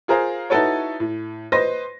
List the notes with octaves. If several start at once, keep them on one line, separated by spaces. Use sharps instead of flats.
F4 G#4 A#4 C5 F5
D#4 E4 F#4 A4 B4 C#5
A2
B4 C5 D#5 C6 A#6